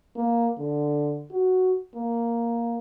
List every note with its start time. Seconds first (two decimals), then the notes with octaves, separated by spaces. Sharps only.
0.16 A#3
0.58 D3
1.31 F#4
1.95 A#3